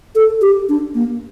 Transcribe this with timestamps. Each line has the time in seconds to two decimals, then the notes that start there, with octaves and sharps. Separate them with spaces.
0.15 A4
0.42 G4
0.69 D4
0.95 A#3